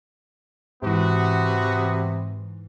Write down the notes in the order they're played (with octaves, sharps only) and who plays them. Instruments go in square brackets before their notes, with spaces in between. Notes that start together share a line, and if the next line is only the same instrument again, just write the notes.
[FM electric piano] G#2 E3 [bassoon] C3 [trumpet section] B3 F#4